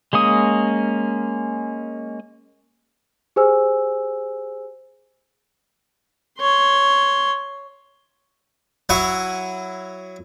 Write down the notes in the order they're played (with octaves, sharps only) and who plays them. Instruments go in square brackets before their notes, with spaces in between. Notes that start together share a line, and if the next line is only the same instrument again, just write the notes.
[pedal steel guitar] G#3 A#3 C#4 D#6
[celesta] G4 G#4 C5 G#5 E6
[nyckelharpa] C#5 C6
[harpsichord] F#3 E4 F#5 C#6 D#6